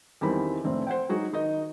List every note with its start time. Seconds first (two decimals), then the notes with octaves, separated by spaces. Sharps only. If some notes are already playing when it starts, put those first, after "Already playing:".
0.21 E2 D#3 E3 G3 C4 B5
0.64 F1 A2 C4 E5
0.87 C5 F#5 G5
1.09 F#3 D#4 F#4 G#4
1.33 D#3 D#4 D#5